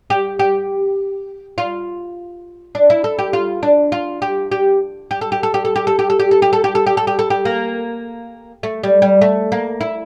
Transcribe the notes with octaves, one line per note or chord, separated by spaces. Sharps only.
G4
G4
F4
D4
E4
A4
G4
F4
D4
F4
G4
G4
G4
A4
G4
A4
G4
A4
G4
A4
G4
A4
G4
A4
G4
A4
G4
A4
G4
A4
G4
A4
G4
A#3
A3
G3
G3
A3
A#3
E4